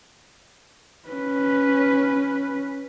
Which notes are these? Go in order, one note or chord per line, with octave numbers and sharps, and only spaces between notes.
C#4 B4